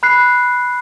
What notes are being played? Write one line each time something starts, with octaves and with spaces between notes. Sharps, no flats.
B5 F#6 C7